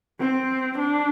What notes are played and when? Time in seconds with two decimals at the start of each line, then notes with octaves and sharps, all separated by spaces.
0.20 C4
0.78 D4